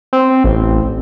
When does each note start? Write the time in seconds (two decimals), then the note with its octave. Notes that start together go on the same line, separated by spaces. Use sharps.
0.13 C4
0.44 A1